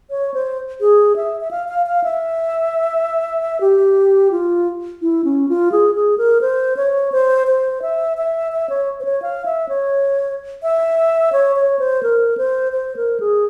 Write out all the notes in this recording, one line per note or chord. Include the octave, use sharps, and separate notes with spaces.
C#5
C5
G#4
E5
E5
F5
F5
F5
E5
G4
F4
E4
C#4
F4
G#4
G#4
A#4
C5
C#5
C5
C5
E5
E5
E5
C#5
C5
C#5
F5
E5
C#5
E5
C#5
C#5
C5
A#4
C5
C5
A#4
G#4